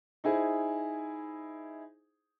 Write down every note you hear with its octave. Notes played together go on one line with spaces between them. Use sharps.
D#4 E4 G#4 C5